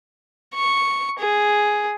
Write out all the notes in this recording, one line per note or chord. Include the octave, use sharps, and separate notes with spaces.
C#6
G#4